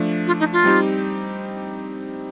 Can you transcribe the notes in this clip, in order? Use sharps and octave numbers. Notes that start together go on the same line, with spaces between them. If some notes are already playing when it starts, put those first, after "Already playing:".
Already playing: F3 A3 D4
F4
D#4
F4
G3 C4 D#4 G4